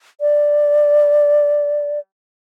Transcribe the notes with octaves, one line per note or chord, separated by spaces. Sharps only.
D5